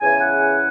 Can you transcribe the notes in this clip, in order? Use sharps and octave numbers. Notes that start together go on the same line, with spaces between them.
E2 C#3 E3 G#5
F#5